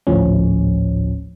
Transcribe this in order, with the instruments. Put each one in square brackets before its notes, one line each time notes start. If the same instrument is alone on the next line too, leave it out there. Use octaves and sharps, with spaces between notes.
[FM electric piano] G#1 D2 A2 F3 C#4